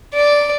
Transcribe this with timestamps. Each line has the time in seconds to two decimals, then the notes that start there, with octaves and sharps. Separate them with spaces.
0.14 D5